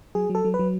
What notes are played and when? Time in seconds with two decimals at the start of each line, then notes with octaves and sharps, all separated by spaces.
0.15 F#3 G#4
0.30 F#3
0.35 A4
0.45 F#3
0.54 B4
0.59 F#3